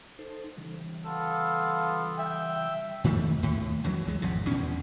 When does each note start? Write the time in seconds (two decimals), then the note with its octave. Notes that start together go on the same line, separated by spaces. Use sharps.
0.19 D#4 A4 C5
0.57 C#3 E3 G3
1.06 B3 F4 A4
2.19 E5 G5
3.04 F2 D#3 F3 A3
3.42 D#2 A2
3.84 C#2 F#2 E3 F#3
4.06 C#2 E3 G#3
4.22 G#1 F2 C3
4.47 E2 B2 C#4